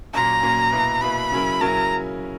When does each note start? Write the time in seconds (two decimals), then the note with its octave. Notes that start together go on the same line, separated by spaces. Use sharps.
0.14 A#2 F#3 A#3 C#4 A#5
0.42 A#2 F#3 A#3 C#4
0.72 B2 A#3 E4 B4
1.01 B2 A#3 E4 B4 B5
1.32 C#3 F#3 C#4 E4 A#4
1.61 C#3 F#3 C#4 E4 A#4 A#5